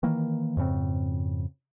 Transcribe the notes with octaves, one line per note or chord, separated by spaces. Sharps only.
D#3 E3 A#3
F2 G#2 C#3 C4